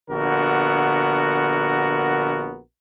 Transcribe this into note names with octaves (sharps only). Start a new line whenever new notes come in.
A#1 D3 B3 F#4 A#4